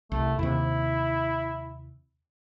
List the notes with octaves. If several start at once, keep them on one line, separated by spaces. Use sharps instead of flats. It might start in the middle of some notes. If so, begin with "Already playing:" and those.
C2 A3
D#2 C3 E4